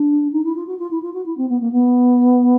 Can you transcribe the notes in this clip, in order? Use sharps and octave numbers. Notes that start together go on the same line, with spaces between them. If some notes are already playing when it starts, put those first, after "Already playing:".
Already playing: D4
D#4
E4
F4
F#4
F4
E4
F4
F#4
E4
C4
B3
A#3
B3